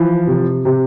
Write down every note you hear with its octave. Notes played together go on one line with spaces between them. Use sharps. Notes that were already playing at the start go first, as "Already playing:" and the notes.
Already playing: E3 F3
C3
C3 G4